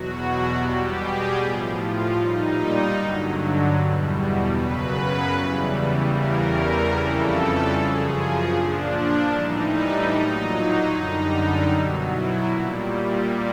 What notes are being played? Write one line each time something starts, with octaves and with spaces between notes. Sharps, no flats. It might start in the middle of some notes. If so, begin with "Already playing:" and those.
Already playing: E2 B2 F#3 F#4
B2 G3 G4
G#4
A2 F3
F4
A#2 G3 D#4
G2 D3 F#3
E2 B2 G3
F#2 C#3 F#3 B4
E2 C#3 E3 G3
E2 C#3 E3 G3 A#4
F2 C#3 E3 G3 A4
F#2 C#3 F3 G#4
A#2 F3 D4
A2 E3 G3 D#4
A#2 F#3 D#4
F#2 D3 G3 D#4
B2 F#3
E4
A#2 G3